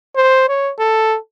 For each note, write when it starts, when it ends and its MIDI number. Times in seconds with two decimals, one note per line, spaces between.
0.16 0.47 72
0.49 0.71 73
0.79 1.17 69